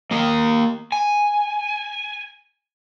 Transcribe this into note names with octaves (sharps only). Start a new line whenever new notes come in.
A#3 D#5
G#5